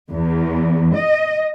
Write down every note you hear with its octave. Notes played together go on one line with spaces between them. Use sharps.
E2
D#5